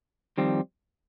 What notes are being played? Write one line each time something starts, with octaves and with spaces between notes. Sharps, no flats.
F2 D#3 G3 C4